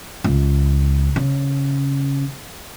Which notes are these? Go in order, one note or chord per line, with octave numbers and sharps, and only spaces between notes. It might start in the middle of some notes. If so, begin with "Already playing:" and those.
C#2
C#3